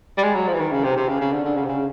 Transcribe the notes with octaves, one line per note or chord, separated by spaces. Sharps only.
G3
G#3
F#3
F3
E3
D#3
C#3
C3
C3
C#3
C#3
D3
D3
C#3
C3
C#3